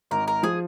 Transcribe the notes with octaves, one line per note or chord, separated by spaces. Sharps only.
G#1 A#4
A#4
F3 G#4